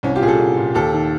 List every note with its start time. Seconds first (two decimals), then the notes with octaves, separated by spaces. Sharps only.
0.03 C2 C#4
0.16 F4 G4
0.21 A#2 G#4
0.28 G4 A4
0.39 C2
0.57 A#2
0.74 D#2 G4 A4
0.93 D#3